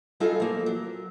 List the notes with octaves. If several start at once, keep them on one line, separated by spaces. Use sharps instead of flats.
F#3 G3 D#4 F4 G#4 A4
F3 A#3
F#3